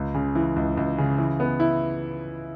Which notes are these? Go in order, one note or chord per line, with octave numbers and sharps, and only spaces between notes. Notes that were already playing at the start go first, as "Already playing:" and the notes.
Already playing: C#2
C#3
E3
C#2
C#2
C#3
E3
B3
E4